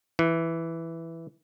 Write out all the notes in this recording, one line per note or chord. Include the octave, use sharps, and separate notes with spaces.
E3